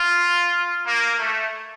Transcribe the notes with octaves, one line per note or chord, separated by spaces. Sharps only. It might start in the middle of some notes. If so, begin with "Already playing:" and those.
Already playing: F4
A#3
A3